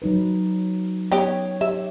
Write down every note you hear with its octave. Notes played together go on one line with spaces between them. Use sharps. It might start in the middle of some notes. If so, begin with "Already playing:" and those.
F#3 D#4 B4
B3 G4 C#5 G5
G4 E5